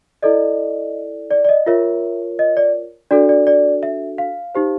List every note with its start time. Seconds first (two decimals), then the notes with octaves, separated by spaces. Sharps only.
0.22 E4 A4 D5 D#5
1.31 D5
1.45 D5
1.49 D#5
1.66 F4 A#4 C#5 E5
2.39 D#5
2.57 D5
3.11 D4 F#4 A4 D5
3.29 D5
3.47 D5
3.83 E5
4.18 F5
4.55 D#4 G4 C5